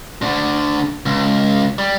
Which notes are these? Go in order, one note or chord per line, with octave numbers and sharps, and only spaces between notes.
D2 D3
C#2
G3